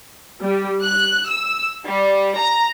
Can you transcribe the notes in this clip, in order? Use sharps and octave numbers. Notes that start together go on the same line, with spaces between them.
G3
F#6
E6
G3
A#5